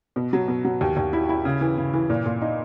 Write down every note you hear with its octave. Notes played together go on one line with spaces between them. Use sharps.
B2
F#3
B2
F#3
D#2
D#2
E4
E4
C#3
E3
C#3
E3
A#2
A#2
D#4